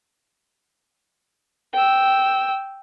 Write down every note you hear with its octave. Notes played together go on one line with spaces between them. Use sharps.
G5 E6